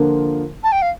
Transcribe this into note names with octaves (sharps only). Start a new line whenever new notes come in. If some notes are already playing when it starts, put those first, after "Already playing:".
Already playing: D3 F3 A#3 F4
A5
G5
F5